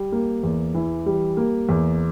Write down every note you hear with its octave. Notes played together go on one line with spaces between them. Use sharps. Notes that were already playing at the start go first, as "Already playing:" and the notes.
Already playing: G3
A#3
E2
E3
G3
A#3
E2